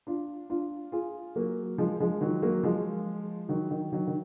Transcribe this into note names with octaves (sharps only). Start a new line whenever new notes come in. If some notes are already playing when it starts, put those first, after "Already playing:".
D4 F4
D4 F4
F4 G#4
F#3 A#3
F3 G#3
F3 G#3
D#3 F#3
F#3 A#3
F3 G#3
D#3 F#3
D#3
D#3 F#3
D#3